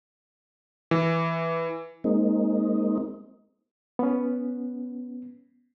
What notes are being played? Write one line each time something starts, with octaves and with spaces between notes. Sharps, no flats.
E3
G#3 A#3 C4 D#4
B3 C#4